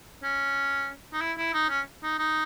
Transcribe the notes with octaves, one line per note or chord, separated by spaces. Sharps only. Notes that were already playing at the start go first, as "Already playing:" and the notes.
C#4
D#4
E4
E4
D#4
C#4
D#4
D#4